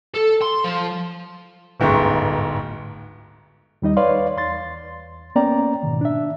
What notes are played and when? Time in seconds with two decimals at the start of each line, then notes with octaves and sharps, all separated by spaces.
0.14 A4
0.42 C6
0.64 F3
1.80 D1 G1 G#2 C#6
3.82 D#2 G3 D#4 D#5
3.97 B4 C#5 D5 F5 C6
4.37 E2 C6 A6
5.35 A#3 B3 C#4 D5 G5 A#5
5.83 G#2 B2 D#3
6.01 D4 E5